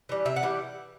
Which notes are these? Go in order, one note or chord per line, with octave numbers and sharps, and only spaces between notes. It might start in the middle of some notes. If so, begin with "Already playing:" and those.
E3 G3
C3 E5
F#5
E3 G3